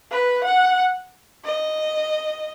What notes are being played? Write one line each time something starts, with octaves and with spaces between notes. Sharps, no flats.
B4
F#5
D#5